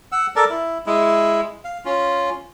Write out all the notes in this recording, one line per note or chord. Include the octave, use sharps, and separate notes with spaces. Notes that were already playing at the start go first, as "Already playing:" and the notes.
F#5 E6
A4 A#4 D5 A5
E4
G#3 E4
F5
C#4 F4